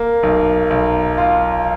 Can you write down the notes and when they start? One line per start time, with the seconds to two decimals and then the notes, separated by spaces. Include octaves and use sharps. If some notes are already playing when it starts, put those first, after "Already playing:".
Already playing: A#3
0.23 B1
0.70 B1
1.18 F4